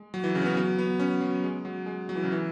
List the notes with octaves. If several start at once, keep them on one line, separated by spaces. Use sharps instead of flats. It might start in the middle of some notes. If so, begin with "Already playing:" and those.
Already playing: G#3
F#3
E3
C#3
C#4
B3
F#3
B3
C#4
F#3
G#3
F#3
G#3
F#3
E3
C#3
E3